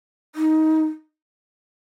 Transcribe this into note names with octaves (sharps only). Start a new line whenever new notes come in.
D#4